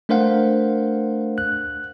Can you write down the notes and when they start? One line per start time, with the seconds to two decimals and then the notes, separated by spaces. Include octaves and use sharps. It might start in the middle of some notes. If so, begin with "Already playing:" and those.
0.09 A3 D4 A#4 C5 F5 F#5
1.38 F#6